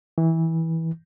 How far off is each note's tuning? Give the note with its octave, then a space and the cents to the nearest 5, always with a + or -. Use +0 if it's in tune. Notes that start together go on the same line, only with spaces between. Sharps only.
E3 -20